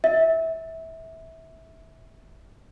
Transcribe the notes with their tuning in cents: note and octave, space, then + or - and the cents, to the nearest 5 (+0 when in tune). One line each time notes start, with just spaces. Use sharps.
E5 -20